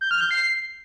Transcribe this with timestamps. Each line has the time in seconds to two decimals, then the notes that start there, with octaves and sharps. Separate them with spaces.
0.01 G6
0.11 F6
0.21 G6
0.31 C7